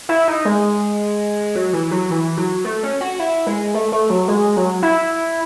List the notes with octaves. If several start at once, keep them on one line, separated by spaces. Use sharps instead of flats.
E4
D#4
G#3
F#3
E3
F#3
E3
F#3
A3
C#4
F#4
E4
G#3
A3
A3
F#3
G#3
F#3
E4